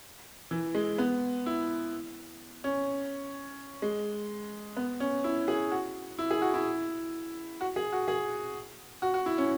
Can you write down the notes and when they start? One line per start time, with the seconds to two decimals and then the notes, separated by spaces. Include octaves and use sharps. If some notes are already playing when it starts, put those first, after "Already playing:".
0.51 E3
0.75 G#3
0.98 B3
1.46 E4
2.64 C#4
3.82 G#3
4.77 B3
5.00 C#4
5.24 E4
5.48 G#4
5.71 F#4
6.19 E4
6.31 G#4
6.42 F#4
6.54 E4
7.61 F#4
7.76 G#4
7.92 F#4
8.08 G#4
9.02 F#4
9.14 F#4
9.26 E4
9.38 C#4